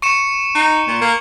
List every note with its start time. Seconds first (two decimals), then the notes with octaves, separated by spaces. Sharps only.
0.02 C#6 C#7 E7
0.55 D#4
0.88 A#2
1.01 A#3